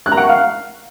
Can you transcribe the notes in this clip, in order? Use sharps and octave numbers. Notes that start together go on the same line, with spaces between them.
F#6
A#5
F#5
C#6
F5